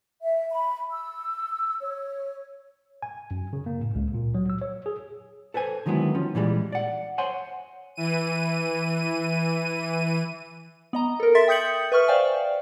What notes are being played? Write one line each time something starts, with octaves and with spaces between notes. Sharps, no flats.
E5
B5
E6
C#5
G#5
F#2
C#3
A#3
A2
C#2
A#2
F#3
E6
C#5
G#4
A4 B4 C5 G#5
D3 D#3 F#3 G#3 B3 E4
D#3 F3 C#4
A#2 E3 G3 G#3
D5 F#5
C5 C#5 F#5 G#5 C6
E3 D#7
B3 D#5 A#5
A4 A#4
E5 C6 A6 B6
G5 D#6 G6 C#7 F#7
B4 E5 C#6 F6
C5 D5 F5 G5 G#5